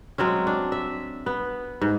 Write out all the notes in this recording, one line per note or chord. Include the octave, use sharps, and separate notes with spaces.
F#3 G#3 C4 C#4
D4
E5
B3
G#2